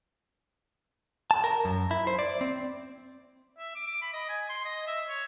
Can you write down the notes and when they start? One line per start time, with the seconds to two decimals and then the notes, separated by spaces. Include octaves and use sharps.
1.31 A5
1.44 A#4
1.65 F#2
1.91 E4
2.07 C5
2.19 D5
2.41 C4
3.58 E5
3.75 D6
3.87 D6
4.02 B5
4.14 D#5
4.29 G#5
4.49 C6
4.65 D#5
4.87 E5
5.09 C#5